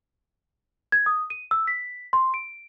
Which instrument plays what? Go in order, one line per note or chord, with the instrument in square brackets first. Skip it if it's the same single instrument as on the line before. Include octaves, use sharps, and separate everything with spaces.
[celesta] G#6
D#6
D#7
E6
B6
C6
D7